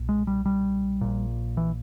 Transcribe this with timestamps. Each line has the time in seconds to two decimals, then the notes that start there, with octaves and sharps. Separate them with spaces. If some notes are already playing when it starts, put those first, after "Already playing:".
Already playing: B1 A#2
0.09 G#3
0.27 G3
0.46 G3
1.01 A#1 A#2
1.57 E3